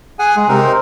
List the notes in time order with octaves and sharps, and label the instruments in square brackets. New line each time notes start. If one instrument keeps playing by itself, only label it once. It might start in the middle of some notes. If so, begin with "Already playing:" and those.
[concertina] G#4 F#5 G#5
[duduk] G#3 [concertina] G#4
[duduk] C3 [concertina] C4 D#4 A#4
[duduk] C5